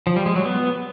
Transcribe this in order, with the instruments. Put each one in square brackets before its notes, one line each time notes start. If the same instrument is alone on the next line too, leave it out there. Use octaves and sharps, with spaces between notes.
[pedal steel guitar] F3
G3
G#3
F#3
B3